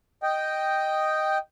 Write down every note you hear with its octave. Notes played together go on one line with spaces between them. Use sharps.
D#5 G5